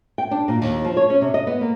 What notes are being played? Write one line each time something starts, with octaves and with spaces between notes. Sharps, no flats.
G5
D4
A#2
D#2
F3
C#5
C#4
C3
D#5
B3
A#3